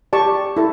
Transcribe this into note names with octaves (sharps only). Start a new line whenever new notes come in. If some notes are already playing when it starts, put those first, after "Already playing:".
G4 D5 A5 C#6
E4 A4